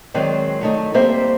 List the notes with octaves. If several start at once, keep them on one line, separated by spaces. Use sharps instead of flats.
D#3 F#3 G#3 C4 D5
F#3 A3 D#4
G3 A#3 C4 C5 E5